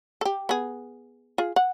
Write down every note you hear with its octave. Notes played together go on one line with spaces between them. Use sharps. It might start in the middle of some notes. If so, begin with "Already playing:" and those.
G4 A4
B3 G#4
F4 G#4
F#5